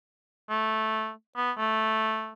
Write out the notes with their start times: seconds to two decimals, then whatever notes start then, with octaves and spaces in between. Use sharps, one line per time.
0.50 A3
1.36 B3
1.58 A3